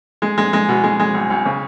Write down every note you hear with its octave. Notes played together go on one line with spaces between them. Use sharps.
G#3
G#3
G#3
B2
G#3
G#3
B1
B1
C#3